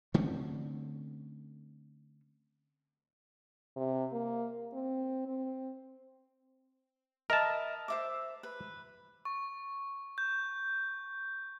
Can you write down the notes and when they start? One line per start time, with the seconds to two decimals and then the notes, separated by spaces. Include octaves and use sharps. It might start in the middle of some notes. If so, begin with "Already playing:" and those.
0.14 D3 A3 C4 C#4
3.77 C3
4.12 A#3
4.73 C4
5.27 C4
7.30 A#4 D#5 E5 A5 B5
7.88 C5 E5 D6
8.43 B4
9.25 C#6
10.18 G6